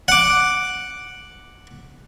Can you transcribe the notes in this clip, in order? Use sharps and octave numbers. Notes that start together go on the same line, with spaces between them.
F#5 D6